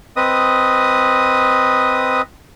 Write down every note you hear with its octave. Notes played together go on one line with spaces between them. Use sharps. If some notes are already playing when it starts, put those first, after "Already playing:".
C4 B4 D#5 D#6